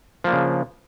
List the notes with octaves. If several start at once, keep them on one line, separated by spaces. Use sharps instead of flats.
C#3 F3 A#3 D4